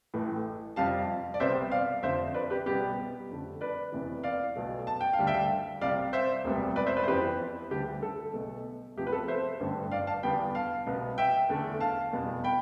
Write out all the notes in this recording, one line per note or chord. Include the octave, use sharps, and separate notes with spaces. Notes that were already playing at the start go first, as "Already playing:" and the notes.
A1 A2 E3 A3
F2 C3 G3 F5 A5
D5
C2 C3 G3 B3 C5 E5
D5 F5
F1 F2 D3 C5 E5
B4 D5
G4 B4
C2 B2 G3 B3 G4 B4
F2 D3 A3
B4 D5
F1 E2 C3 E3
D5 F5
B1 B2 A3
A5
G5
F5
D2 D3 G3
E5 G5
C2 C3 G3 D5 F5
C5 E5
E1 D2 C3 G3 B3
B4 D5
C5 E5
B4 D5
C5
F2 E3 B3 G4 B4
D2 D3 G3 G4
A4
B1 B2 A3
D2 C3 F3 B3 G4
B4
A4
C5 E5
A1 G2 D3 A3
D5 F5
F5 A5
E2 D3 G3 B3 G5 B5
F5 A5
C2 B2 B3
E5 G5
E2 D3 A3
F5 A5
F1 E2 B2 G3 B3
G5 B5